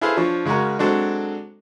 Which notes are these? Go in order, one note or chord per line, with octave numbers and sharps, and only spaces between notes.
E4 G#4 A4 B4 C5 F5
F3 D4 C#5
C#3 G#3 C#4 F#4 A#4
F#3 G#3 C4 D4 F#4 A4